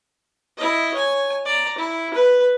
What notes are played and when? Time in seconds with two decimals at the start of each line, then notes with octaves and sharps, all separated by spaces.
0.57 E4 D#5
0.94 C#5 G#5
1.45 D5 A#5
1.78 E4
2.14 B4